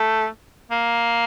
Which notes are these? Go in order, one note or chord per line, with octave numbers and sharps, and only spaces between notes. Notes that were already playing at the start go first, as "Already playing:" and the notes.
Already playing: A3
A#3